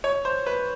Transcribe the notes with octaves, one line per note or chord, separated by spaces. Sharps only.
C#5
C5
B4